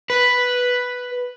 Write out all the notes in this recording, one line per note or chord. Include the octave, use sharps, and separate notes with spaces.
B4